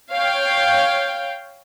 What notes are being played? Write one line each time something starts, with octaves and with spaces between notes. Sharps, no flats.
C#5 F5 G5